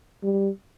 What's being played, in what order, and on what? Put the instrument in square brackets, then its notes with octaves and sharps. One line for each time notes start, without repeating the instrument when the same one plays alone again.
[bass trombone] G3